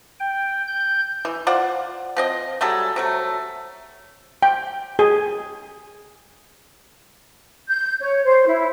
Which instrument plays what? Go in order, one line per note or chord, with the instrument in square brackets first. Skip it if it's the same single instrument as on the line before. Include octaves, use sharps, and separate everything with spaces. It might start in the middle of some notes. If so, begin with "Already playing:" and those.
[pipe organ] G5
G6
[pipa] E3
F4 C5 D5 F#5
F3 C4 D#5
F#3 G3 G#4 A4
C3 F#3 A3
[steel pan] G5
G#4
[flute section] G6
C#5
C5
E4